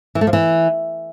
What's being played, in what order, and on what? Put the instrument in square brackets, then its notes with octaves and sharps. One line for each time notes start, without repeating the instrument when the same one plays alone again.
[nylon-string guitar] E3
A3
F3
E3